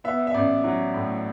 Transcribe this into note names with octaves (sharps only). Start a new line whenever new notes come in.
B3 E5
E5
A1 D5
F#3
A2